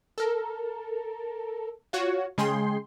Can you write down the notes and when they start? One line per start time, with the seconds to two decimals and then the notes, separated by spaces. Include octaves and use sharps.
0.18 A4 A#4
1.93 F4 F#4 C#5
2.38 C#3 G#3 G#4 G5 C6